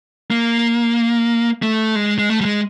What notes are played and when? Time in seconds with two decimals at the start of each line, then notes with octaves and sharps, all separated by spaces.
0.31 A#3
1.62 A3
1.95 G#3
2.19 G#3
2.29 A3
2.41 G3
2.45 G#3